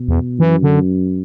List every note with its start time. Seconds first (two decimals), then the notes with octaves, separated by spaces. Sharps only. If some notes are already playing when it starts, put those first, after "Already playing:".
Already playing: B2
0.08 E2
0.40 F#2 E3
0.63 D3